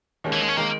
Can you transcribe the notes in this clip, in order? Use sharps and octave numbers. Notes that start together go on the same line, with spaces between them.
D#2 D#3 G#3 C#4
E3
G#3
C#4
D#3 G#3 A#3